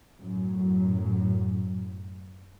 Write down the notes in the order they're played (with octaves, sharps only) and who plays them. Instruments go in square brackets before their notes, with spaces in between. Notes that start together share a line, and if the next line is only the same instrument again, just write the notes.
[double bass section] F#2 A2 F#3